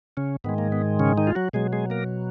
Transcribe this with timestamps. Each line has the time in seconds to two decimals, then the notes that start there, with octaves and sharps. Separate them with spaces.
0.17 C#3 C#4
0.44 G#2 D#3 G#3 B3
0.58 A#3
0.72 B3
0.99 C#3 C#4
1.18 D#3 D#4
1.27 F4
1.35 F#3 F#4
1.53 B2 F#3 G#3 G#4
1.72 G#3 G#4
1.90 A#3 A#4